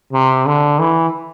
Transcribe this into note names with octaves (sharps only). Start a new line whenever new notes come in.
C3
D3
E3